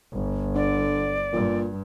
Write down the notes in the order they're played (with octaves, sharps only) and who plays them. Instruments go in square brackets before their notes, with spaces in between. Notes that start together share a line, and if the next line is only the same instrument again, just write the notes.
[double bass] G1
[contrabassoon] D3 [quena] D5
[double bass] G2 [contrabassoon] A#2